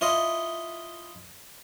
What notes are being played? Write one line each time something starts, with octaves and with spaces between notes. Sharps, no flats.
E4 F4 C#5 D#5